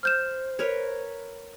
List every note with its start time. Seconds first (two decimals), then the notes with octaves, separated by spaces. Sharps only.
0.03 C5 F6 G6 E7
0.59 A#4 B4 C#5